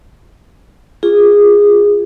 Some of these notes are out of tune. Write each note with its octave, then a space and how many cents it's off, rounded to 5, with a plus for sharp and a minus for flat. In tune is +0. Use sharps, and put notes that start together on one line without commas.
F4 +0 G#4 -15